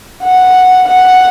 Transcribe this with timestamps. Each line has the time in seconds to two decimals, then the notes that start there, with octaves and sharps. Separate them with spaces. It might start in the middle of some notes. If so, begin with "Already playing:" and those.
0.23 F#5
0.86 F#5